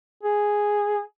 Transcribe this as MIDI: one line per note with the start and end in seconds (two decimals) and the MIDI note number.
0.23 1.01 68